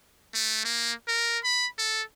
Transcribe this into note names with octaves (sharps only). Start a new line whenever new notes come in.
A3
A#3
A#4
B5
A4